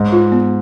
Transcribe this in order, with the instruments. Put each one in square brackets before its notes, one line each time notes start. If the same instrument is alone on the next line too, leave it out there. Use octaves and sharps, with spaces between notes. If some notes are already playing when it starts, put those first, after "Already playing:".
Already playing: [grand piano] G#2 [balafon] D#5
[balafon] F4
B3